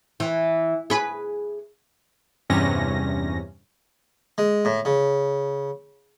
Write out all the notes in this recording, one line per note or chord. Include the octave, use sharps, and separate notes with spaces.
E3
G#4 B4
E2 G2 C3 C#4 A#6
G#3
A2
C#3